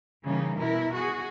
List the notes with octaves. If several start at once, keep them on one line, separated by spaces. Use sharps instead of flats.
C#3 E3 G3 A#3 D#4
B2 E4 A#4
F#4 G#4